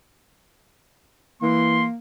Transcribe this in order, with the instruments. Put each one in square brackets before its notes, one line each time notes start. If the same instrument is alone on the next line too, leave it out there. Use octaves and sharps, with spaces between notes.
[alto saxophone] E3 [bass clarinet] A#3 [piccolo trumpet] C6